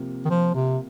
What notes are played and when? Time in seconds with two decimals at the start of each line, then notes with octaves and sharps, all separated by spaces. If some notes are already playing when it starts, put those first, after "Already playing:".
Already playing: C3 F3 A#3
0.25 D#3
0.30 F3
0.55 C3